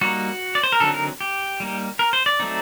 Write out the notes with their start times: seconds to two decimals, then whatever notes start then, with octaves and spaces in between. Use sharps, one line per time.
0.01 G3 A#3 D#4 F#4
0.55 D5
0.63 C5
0.72 A#4
0.80 D3 F#3 C4 D#4 A4
0.94 A#4
1.21 G4
1.60 G3 A#3 D#4
1.99 A#4
2.13 C5
2.26 D5
2.40 F#3 A3 C4 D#4